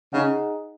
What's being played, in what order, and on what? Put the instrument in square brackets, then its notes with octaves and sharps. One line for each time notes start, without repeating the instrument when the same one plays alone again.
[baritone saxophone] C#3 [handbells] D#4 G#4 D#5 F#5